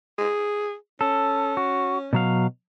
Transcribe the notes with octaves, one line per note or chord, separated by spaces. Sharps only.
G#4
C#4 A4
F#4
B2 F#3 F5